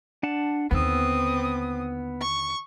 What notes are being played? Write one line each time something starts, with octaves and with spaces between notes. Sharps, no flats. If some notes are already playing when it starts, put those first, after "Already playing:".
D4 F#5 A5
D#2 D3 B3 C4 D#6 E6
C#6